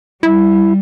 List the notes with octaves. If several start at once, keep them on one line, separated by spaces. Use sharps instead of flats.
G3 E4